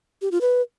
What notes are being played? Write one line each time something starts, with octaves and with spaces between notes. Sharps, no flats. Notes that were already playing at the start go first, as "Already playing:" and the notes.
G4
F4
B4